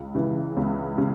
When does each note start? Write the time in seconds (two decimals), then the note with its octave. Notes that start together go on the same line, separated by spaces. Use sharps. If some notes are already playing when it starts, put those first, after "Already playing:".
Already playing: C#2
0.15 C#3 E3
0.57 C#2
0.98 C#3